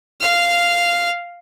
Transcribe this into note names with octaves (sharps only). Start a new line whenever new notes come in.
F5 F6